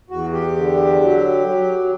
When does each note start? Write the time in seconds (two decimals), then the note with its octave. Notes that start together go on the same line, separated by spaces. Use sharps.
0.10 E2 F#4
0.32 G4
0.56 D3
1.01 F#3
1.46 F#3